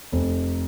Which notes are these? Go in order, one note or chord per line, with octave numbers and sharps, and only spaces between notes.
F1